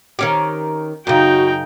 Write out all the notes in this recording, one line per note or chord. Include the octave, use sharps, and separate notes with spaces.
D#3 C#4 G4
F#2 C#3 D#4 F#4 G5